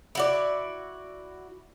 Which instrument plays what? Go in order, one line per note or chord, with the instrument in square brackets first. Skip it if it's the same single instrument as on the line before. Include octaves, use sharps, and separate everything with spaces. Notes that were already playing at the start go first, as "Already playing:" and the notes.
[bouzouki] E4 F#4 D5